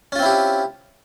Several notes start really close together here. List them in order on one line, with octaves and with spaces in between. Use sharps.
C#4 F4 C4 E4 G4